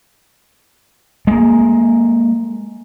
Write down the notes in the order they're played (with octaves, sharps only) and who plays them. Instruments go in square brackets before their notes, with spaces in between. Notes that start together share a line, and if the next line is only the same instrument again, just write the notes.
[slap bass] G#3 A#3